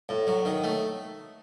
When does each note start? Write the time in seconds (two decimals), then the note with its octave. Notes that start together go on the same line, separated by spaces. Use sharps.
0.09 A2
0.27 F#3
0.45 D#3
0.64 A3